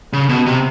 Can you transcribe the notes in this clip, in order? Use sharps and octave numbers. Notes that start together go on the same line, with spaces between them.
C#3
B2
C3